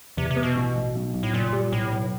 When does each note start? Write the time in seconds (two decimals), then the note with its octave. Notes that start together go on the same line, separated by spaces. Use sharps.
0.17 E2 C3
0.31 C3
0.36 B3
0.43 B2
0.56 A1
0.76 A1
0.95 B1
1.14 B1
1.23 A2
1.34 F#1 A#2
1.53 G3
1.72 B1 A2
1.92 B1